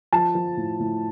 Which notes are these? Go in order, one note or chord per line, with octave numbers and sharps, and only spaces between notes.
F3 A5
F3
A2
A2